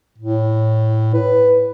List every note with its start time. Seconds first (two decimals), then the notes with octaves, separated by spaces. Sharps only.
0.18 A2
1.14 B4